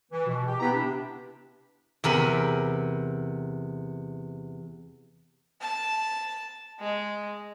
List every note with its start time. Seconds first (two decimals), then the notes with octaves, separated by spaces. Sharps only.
0.11 E3
0.27 B2
0.46 G4
0.60 B3 E4 G4 B4 A#5 B5
0.72 C3 D4
2.04 E2 C3 A#4 B5
5.61 A5
6.80 G#3